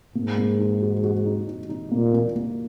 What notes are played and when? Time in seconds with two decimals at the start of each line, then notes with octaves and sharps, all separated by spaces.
0.15 G#2 A#3
0.38 A#3
0.59 D#4
0.81 F#4
1.03 F#4
1.26 D#4
1.47 D#4
1.69 D#4
1.91 A#2 A#3
2.14 A#3
2.36 A#3